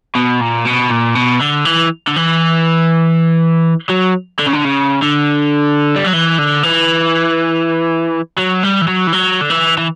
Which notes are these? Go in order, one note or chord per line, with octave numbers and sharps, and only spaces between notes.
B2
A#2
B2
A#2
B2
D3
E3
D3
E3
F#3
D3
C#3
D3
C#3
D3
G3
F#3
E3
D3
E3
F#3
G3
E3
F#3
E3
F#3
D3
E3
E3